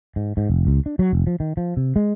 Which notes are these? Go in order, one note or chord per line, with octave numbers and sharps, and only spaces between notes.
G#2
G#2
F1
C#2
D4
F#3
F1
F3
D#3
F3
C3
G#3